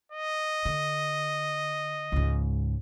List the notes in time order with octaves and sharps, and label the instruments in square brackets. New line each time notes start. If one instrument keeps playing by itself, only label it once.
[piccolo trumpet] D#5
[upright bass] D3
C#2 G#2